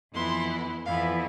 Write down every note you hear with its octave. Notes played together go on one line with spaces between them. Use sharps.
F2 E3 B3 E4 C6
F2 E3 B3 E4 F5